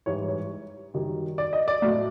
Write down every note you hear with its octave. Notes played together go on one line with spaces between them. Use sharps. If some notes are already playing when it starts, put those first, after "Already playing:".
G#2 E3 G3 C#5
C#5
F#2 D#3 G3
D5
D#5
D5
A2 F#3 D5